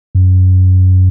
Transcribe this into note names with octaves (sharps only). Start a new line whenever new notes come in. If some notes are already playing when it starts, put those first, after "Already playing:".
F#2